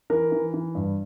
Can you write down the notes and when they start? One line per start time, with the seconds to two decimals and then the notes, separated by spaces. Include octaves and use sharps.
0.10 E3 A#4
0.32 E3
0.54 E3
0.75 G2